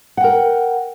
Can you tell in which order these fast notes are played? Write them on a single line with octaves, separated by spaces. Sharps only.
F#5 G5 A#4